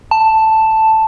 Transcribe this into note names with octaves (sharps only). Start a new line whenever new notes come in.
A5